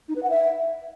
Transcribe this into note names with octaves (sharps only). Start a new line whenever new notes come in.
D#4
B4
F#5
E5